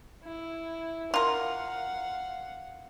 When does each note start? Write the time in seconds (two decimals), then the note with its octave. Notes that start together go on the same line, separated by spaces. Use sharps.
0.24 E4
1.14 F4 A#4 F5 F#5